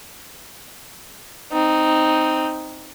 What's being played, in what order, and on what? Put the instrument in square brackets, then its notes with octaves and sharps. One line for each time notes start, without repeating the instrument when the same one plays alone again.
[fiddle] C4 D#4